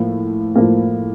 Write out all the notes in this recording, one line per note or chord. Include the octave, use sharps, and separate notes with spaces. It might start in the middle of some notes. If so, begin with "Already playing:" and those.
Already playing: A2 F3 A#3
A2 F3 A#3